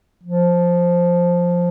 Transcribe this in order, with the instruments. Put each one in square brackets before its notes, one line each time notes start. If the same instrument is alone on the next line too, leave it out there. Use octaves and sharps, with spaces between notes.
[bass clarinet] F3